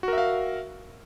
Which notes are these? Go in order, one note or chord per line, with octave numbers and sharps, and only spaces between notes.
F#4 A#4 E5 F5